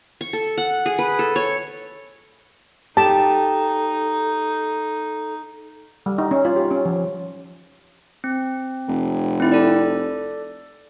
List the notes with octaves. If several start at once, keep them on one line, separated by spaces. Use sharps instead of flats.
C#6
A4
F#5
G#4
B4
A4
C#5
D#4 G4 A4 A5
G3
D#4
C#4
F4
G4
C#4
F3
C4
F1
C4 E4
A4 D5